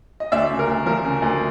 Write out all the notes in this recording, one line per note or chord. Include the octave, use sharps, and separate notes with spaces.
D#5
D2 D5 E5
C#3
A#4
D2
F3 A#4
C#3
D2